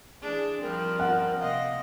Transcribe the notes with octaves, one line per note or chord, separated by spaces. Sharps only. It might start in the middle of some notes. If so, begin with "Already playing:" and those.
E3 D4 G#4
F3 G3 C4 A#4
F#5
C3 A#3 D#5 F5